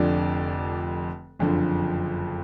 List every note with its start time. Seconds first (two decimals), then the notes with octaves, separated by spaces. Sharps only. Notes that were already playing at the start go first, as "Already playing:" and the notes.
Already playing: F1 F2 D3 D5
1.39 F#1 F2 D3 F3